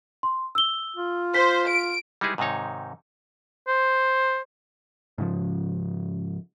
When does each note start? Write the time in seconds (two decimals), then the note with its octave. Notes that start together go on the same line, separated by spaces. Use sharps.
0.23 C6
0.55 E6 G7
0.96 F4
1.35 C5 B6
1.68 D7
2.21 G3 G#3 D#4 E4 G#4 B4
2.38 G#2 C3 D#3 D#4 C#5
3.68 C5
5.18 G#2 C#3 F3